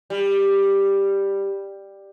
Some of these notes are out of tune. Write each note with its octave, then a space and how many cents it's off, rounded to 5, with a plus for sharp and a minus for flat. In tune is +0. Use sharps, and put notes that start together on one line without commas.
G3 +5